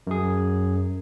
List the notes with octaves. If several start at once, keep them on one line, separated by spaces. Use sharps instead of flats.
F#2 G#4